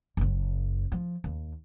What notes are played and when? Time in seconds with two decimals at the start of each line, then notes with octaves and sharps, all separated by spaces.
0.17 F#1 F#2
0.92 F3
1.24 D#2